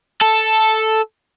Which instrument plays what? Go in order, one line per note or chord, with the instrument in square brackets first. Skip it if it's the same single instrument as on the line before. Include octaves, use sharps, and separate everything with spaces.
[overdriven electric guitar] A4